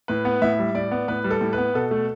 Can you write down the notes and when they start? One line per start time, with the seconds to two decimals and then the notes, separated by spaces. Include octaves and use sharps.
0.08 A2 B4
0.25 B3
0.42 A2 E5
0.59 G3
0.75 A2 D5
0.91 B3
1.08 A2 B4
1.24 G3
1.30 A4
1.41 A2
1.53 B4
1.58 B3
1.74 B2 A4
1.91 A3